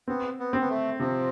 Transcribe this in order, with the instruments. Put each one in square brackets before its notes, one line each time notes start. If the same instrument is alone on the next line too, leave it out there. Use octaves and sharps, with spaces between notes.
[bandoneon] B3 [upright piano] C4
[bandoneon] B3
[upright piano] C4
[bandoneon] B3
A3
[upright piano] C3 [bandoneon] F3